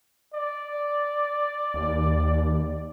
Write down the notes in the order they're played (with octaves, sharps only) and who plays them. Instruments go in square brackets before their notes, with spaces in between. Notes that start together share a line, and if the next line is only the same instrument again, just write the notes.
[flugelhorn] D5
[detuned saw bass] D#2